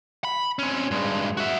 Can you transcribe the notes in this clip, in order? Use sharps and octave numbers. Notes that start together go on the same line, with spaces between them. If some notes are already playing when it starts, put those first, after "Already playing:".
B5
C4 C#4
G2 G#3
F#4 E5